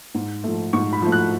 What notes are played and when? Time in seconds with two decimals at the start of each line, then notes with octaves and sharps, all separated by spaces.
0.15 G#2
0.44 F3 A3
0.73 G#2 C#6
0.93 B5
1.02 F3 A3
1.12 F#6